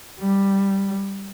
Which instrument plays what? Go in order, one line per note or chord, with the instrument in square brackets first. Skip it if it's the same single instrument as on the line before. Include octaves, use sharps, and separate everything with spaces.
[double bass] G3